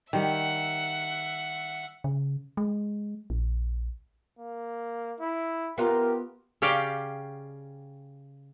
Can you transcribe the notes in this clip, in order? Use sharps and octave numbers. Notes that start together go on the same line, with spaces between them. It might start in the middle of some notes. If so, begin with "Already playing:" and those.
D#3 G3 E5 F#5
C#3
G#3
A#1
A#3
E4
B3 F4 G4 A#4
C#3 C#4 G4 D5 F5 G5